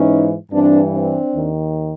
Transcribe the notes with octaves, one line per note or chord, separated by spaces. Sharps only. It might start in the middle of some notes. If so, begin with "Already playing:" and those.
Already playing: G#2 E3 C#4 D#4
G2 E3 C4 D4
C4 D4
D#2 D#3